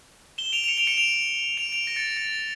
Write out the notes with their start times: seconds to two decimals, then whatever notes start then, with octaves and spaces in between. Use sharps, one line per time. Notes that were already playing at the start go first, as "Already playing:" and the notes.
0.38 E7 G7
0.53 D7 F7
0.64 F7
0.68 C#7 E7
0.78 D7 F7
0.87 C#7 E7
0.97 D7 F7
1.57 D7 F7
1.72 D7 F7
1.86 A#6 D7
1.96 A6 C#7
2.06 A#6 D7
2.17 A6 C#7